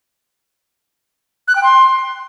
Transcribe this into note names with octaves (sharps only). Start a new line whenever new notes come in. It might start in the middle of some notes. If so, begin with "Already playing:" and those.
F#6
G5
C6